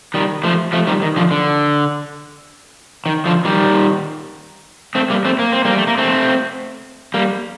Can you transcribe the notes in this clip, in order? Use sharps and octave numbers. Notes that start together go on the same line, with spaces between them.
D#3 G3
F3 A3
F3 A3
D#3 G3
D#3
D3 F3
D3
D#3
D3 F3
D#3 G3
A3 C4
G3 A#3
A3 C4
A#3
C4
G3 A#3
A3
A#3
A3 C4
G3 A#3